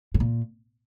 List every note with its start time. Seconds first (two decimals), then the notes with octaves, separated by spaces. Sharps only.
0.14 A2
0.20 A#2